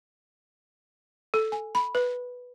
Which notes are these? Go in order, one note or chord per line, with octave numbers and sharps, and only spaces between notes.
A4
G#5
B5
B4